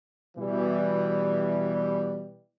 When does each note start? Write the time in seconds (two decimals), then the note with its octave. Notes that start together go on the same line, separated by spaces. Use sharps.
0.37 B2 E3 G3